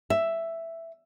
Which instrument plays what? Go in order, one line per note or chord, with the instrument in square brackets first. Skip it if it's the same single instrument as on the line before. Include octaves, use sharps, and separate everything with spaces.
[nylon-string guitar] E5